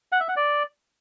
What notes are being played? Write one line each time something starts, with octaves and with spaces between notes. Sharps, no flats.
F#5
E5
F#5
D5